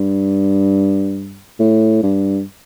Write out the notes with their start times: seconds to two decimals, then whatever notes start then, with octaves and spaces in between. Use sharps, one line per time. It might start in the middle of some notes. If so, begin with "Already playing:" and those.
Already playing: G2
1.60 A2
2.03 G2